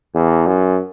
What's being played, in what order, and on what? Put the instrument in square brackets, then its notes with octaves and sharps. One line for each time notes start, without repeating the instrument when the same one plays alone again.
[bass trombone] E2
F#2